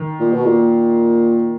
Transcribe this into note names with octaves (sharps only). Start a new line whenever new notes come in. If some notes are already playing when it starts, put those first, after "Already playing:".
Already playing: D#3
A#2
B2
A#2